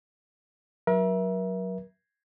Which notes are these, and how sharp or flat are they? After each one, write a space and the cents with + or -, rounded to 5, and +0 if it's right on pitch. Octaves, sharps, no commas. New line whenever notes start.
F#3 +0 A#4 +40 E5 +0